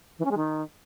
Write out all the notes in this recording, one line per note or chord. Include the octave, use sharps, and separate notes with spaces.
E3
C#4
G#3
D#3